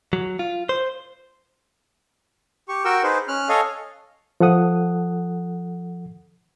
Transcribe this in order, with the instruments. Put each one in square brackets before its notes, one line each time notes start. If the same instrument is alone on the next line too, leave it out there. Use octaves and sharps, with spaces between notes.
[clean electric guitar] F#3
F4
C5
[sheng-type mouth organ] G4 C#6
F#4 A#4 G5 C#6 E6
D#4 G#4 B4 C5
C#4 F6 F#6
A4 C#5 D#5 F5 G#5
[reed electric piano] F3 A4 F#5 D#6